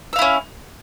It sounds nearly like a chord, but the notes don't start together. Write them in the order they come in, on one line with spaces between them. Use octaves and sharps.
E5 F5 E4 C#4